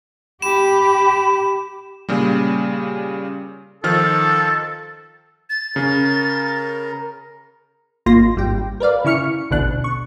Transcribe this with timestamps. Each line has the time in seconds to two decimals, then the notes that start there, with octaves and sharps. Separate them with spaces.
0.42 G4 B5 E7
2.09 A#2 C#3 G3
3.84 D#3 F3 A4 F6
5.50 A6
5.76 C#3 A#4
8.06 G#1 A#3 F4 C6 A#6
8.36 G#1 G3 G5
8.80 A#4 B4 D5 F5
9.05 C#3 E4 C#6 F6 C#7
9.51 A1 D2 B2 D4 F#6
9.84 C#6